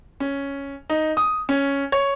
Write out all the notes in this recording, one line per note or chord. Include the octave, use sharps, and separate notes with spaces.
C#4
D#4
D#6
C#4
C#5